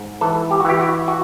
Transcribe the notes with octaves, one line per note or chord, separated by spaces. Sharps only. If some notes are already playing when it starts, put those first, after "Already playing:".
Already playing: G#2
E3 A4
G4
F#4
E3 G4
F#4
F#4